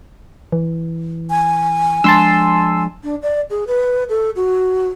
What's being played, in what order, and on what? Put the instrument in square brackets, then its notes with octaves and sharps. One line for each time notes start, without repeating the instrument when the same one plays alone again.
[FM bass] E3
[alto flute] G#5
[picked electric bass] F3 G#3 D4 [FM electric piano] A5 C6 E6
[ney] D4
D5
G#4
B4
A4
F#4